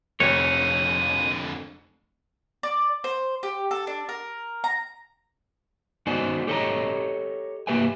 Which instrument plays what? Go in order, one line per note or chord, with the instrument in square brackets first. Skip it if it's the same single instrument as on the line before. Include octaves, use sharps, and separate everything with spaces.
[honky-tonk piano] F1 [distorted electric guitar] F2 D3 [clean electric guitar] C#5 [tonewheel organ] D#6
[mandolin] D5
C5
G4
A4
D4
A#4
A#5
[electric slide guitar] B3 D#4 F#4 C5 D5 G#5
G4 A4 C#5 D#5 A#5
A#3 G4 B4 E5 G#5